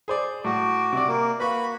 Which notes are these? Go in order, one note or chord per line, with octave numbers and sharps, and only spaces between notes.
G#4 C5 D5
A2 F#4 D6
C3 D5
A#3
A#3 F#4 B4 B5 C#6